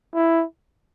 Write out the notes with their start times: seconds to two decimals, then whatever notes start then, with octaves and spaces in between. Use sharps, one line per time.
0.14 E4